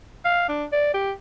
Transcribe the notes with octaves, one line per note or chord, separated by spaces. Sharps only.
F5
D4
D5
G4